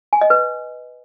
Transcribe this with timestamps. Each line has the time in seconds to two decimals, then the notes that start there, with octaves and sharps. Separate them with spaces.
0.13 G#5
0.21 D#5
0.30 B4